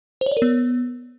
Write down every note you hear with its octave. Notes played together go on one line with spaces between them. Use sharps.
C5
C#5
D5
A#4
B3